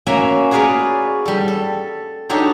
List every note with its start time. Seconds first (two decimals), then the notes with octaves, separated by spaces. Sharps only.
0.06 A#3 C#4 F#4 E5 G#5 A#5
0.51 F#4 G#4 A#4 B4 C#5 D5
1.25 G3 A4
1.48 A4
2.29 D4 D#4 F#4 G4 A4 C#5